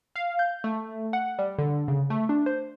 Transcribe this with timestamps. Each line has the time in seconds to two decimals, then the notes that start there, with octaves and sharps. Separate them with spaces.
0.16 F5
0.39 G6
0.64 A3
1.13 F#5
1.39 G3
1.59 D3
1.88 C#3
2.10 A3
2.29 D4
2.46 C5